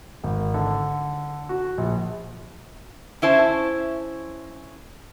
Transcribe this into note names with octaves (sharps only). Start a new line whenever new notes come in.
G#1
D3
F#4
A#1
C#4 E4 C5 A5